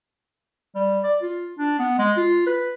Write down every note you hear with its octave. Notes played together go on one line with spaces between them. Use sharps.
G3
D5
F4
D4
B3
G#3
F4
B4